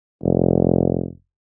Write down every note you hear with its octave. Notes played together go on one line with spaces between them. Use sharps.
F1